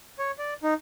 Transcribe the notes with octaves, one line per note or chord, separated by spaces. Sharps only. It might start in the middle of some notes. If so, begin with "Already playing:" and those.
C#5
D5
D#4